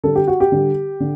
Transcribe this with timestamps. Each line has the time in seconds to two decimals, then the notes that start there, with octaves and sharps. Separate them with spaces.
0.03 D3 G3 A4
0.15 G4
0.28 F#4
0.40 G4
0.52 D3 G3
1.00 D3